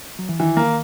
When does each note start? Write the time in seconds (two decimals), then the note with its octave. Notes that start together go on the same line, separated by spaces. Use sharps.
0.19 F#3
0.29 E3
0.40 D#3 E3
0.57 A#3